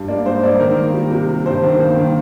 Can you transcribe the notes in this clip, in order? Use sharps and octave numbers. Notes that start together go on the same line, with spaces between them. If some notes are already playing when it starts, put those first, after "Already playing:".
Already playing: G2
A#3 D5
G#2 C5
G#2 D5
D#3 A#4
A#3
G3
C3
C3
G2 C5
D#3
A#3
D#3